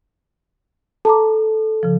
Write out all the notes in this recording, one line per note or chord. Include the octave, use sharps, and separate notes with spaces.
A4 A5 A#5 D6
C#3 F3